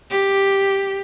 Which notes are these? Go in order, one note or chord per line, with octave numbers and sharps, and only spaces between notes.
G4